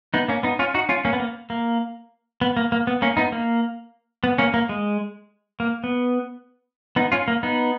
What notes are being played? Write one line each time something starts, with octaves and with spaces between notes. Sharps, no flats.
B3 D#4
A#3 C#4
B3 D#4
C#4 F4
D#4 F#4
C#4 F4
A#3 C#4
B3
A#3
A#3
B3
A#3
A#3
B3
A#3 C#4
B3 D#4
A#3
B3
A#3 C#4
A#3
G#3
A#3
B3
B3 D#4
C#4 F4
A#3
B3 D#4